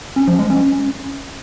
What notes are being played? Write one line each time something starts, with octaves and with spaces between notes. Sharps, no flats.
C#4
F3
G#3
C#4